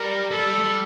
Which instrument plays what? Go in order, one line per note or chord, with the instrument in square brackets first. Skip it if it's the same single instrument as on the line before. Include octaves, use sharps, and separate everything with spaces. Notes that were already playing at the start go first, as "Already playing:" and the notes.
Already playing: [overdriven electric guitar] G3 [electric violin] A#4
[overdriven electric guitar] G3 [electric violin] A4
[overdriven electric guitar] G3
A3
G3